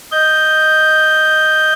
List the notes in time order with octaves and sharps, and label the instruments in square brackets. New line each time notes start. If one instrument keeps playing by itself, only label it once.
[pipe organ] D#5 G6